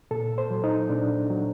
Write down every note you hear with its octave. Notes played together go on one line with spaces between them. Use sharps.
A#2 A4
C5
F#3
D#4
A#2 D4
F#3